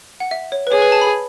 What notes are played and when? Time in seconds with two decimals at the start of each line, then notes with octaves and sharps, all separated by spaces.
0.20 F#5
0.31 E5
0.52 C#5
0.67 B4
0.72 G#4 C#5
0.82 B4
0.92 A5
1.01 B5